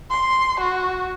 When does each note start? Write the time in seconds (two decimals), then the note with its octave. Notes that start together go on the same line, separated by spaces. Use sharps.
0.11 C6
0.60 F#4